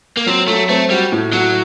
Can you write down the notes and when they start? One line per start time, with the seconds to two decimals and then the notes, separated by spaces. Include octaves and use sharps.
0.17 A#3
0.26 F#3 C4
0.47 F#3 A3
0.69 A3 C4
0.90 G3 F#4
1.12 A2
1.33 F#3 F#4